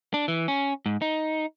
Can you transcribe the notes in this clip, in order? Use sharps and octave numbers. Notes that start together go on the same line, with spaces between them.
D4
E3
C#4
G#2
D#4